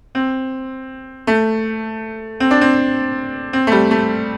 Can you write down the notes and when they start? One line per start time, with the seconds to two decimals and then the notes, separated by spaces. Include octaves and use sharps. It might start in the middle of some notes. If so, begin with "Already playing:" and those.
0.15 C4
1.27 A3
2.40 C4
2.51 D4
2.61 C4
3.53 C4
3.67 A3
3.72 G3
3.91 A3